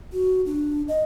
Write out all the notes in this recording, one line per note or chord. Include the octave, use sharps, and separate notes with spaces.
F#4
D4
D#5